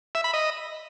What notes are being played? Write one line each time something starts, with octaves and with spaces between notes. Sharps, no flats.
E5
B5
D#5